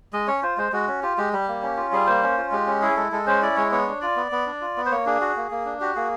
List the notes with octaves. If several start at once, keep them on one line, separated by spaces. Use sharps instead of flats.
G#3 D#5
C#4 C#5
F4 C5
G#3 C5
G#3 F#4
C#4
F4 G4
G#3 G4
G3 G4
A#3
C#4
F4
G3 G#4
A#3 C5
C#4
F4
G#3 G4
C#4
E4 G#4
G#3 A4
G#3 A4
C#4 C5
E4 D5
G#3 C#5
B3 C#5
D4
F4 D5
B3
B3
D4
F4
B3
C5
A#3 C#5
D4 G#4
F#4
A#3
A#3
D4
F#4 G4
A#3 G#4